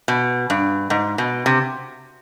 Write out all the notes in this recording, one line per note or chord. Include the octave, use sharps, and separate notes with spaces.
B2
G2
G#2
B2
C3